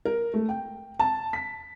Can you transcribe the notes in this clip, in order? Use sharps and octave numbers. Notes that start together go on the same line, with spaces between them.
A#4
A3
G5
A5
B6